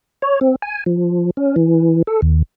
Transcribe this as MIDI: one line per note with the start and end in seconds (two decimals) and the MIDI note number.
0.22 0.40 73
0.41 0.56 60
0.62 0.84 80
0.86 1.31 53
1.37 1.56 61
1.56 2.02 52
2.07 2.21 69
2.22 2.42 39